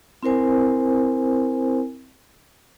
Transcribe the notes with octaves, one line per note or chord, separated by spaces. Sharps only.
C4 E4 A#4 C5 G#5